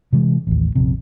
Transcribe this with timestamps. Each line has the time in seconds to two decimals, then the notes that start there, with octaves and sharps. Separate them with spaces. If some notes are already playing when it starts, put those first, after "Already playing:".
0.13 C3 E3 G#3
0.47 A1 D#2
0.75 A#1 F2 C3